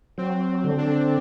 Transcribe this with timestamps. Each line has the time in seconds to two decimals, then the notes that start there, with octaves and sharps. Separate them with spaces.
0.18 F#3 C4
0.64 D3
0.78 D4